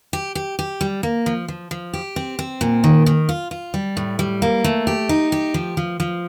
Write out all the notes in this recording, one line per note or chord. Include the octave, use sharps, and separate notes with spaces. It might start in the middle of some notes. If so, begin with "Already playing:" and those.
G4
G4
G4
G3
A#3
F3
F3
F3
G4
C4
C4
A#2
D#3
D#3
F4
F4
G3
A2
G3
A#3
A3
G4
D#4
G4
F3
F3
F3